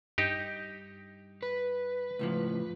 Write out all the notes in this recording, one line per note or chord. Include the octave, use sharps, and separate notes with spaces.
G2 D#4 G4
B4
C#2 A2 F3